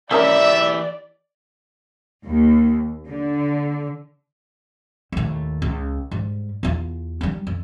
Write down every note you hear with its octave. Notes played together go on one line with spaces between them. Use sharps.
D#3 E3 C#4 G4 A#4 D5 E5
D#2
D3
D#2 A2
C#2
G#2 G3
E2 F4
G3 D#4
F2